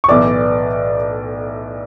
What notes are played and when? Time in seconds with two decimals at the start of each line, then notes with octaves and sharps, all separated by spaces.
0.04 C#6
0.08 B1 A2 E3 D5 D6